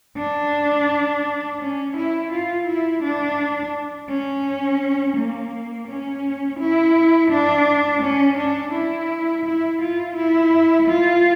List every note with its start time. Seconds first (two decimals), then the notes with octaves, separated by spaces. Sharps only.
0.17 D4
1.60 C#4
1.97 E4
2.31 F4
2.67 E4
3.02 D4
4.10 C#4
5.17 A#3
5.88 C#4
6.60 E4
7.31 D4
8.02 C#4
8.38 D4
8.73 E4
9.45 E4
9.81 F4
10.16 E4
10.88 F4